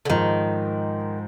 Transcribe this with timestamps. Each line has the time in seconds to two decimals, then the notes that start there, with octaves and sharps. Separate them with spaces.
0.05 D3
0.10 G#2 D#3 F3 G#3